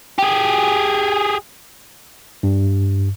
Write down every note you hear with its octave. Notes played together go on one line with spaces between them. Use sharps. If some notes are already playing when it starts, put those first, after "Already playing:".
G4 G#4
G2